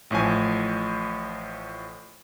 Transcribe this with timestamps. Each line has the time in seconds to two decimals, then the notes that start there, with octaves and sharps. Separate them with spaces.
0.10 A1 A2 F3 G#5